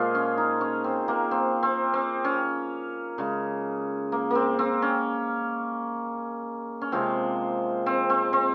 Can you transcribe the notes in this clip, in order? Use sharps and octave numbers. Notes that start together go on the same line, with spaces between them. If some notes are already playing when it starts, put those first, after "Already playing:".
Already playing: A#2 F3 G#3 F4 G#4
C#4
D#4
C#4
C4
A#3
C4
C4
C4
C#4
C#3 G#3
A#3
A#3 C4
C4
C#4
C#4
C3 F3 G#3 C4
C4
C4
C4